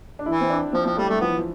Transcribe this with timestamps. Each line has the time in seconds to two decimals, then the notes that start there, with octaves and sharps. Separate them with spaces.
0.19 D4
0.26 E3 E4
0.41 C4
0.50 D4
0.73 F3 C4
0.85 F3 C4
0.97 G3 A3
1.09 G3 A3
1.20 F3 B3
1.28 E3
1.37 F3